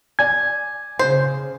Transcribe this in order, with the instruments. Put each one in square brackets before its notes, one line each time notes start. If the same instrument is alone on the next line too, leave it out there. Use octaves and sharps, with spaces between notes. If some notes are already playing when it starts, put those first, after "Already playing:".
[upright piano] D5 G#5 [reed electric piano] G#6
[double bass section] C#3 [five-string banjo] C5